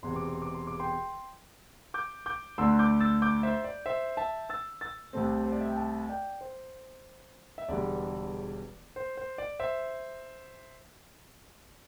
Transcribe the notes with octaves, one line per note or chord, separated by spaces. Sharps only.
E1 E2 C3 C6
D6
C6
D6
C6
D6
G5 C6
D6 G6
D6 G6
D2 D3 A3 D4 C6 E6
D6 G6
E6 A6
D6 G6
C5 E5
D5
C5 E5
E5 A5
E6 A6
E6 A6
C2 C3 A3 C4
C5
D5
E5
G5
E5 A5
D5 G5
C5
E5
E1 E2 D3 G3 D5
C5
C5
D5
C5 E5